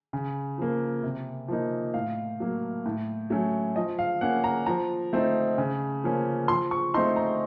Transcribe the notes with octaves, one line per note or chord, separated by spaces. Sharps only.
C#3
F3 A#3
C3
F3 A#3 D#4
A2 F5
F#3 A#3
A2
F#3 A3 C#4
F3 D#5
F5
A#3 C#4 F#5
A#5
F3 A#5
A3 C4 D#4
C#3
F3 A#3 C#4
F3 C6
C#6
A3 C4 D#4 C6
A#5